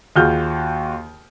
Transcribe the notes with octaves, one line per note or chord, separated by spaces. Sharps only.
D#2 F4 F#4 G#4 F6 G6